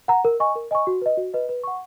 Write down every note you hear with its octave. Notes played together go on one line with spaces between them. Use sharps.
F#5 A#5
A#4
D#5 G#5 C#6
A#4
D#5 G#5 C#6
F#4
B4 D#5
F#4
B4 D#5
B4
F#5 C#6